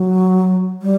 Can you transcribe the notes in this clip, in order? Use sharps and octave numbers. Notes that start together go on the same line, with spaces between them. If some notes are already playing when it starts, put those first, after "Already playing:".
Already playing: F#3
G3